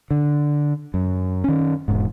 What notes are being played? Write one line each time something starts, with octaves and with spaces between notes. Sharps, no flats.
D3
F#2
D#3 C#4
E1 G#2